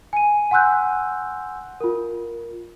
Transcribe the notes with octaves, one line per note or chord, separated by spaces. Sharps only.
G#5 D#7
F#5 G#5 C6 E6 F#6 G6
F4 A#4